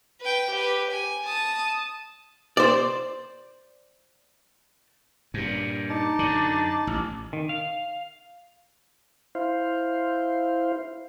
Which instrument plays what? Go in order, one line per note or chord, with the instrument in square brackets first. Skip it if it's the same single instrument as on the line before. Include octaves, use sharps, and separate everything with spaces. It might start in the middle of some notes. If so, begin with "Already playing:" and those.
[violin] B4 G5
G4 B4
G#5
A5 D#6
[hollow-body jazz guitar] C5 D5
[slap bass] G2 A#2
[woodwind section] D#4 A5 D6
[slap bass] F#2 D3
A1
[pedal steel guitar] D#3
F5
[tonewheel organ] E4 C5 F5